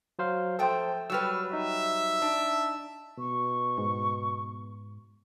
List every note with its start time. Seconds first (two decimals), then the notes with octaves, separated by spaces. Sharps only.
0.19 F#3 C5 F5
0.59 F3 A3 A4 C5 G5
1.10 F#3 G3 B4 E6 F6
1.53 D#4 E5
2.22 D4
3.18 B2 C#6
3.78 G#2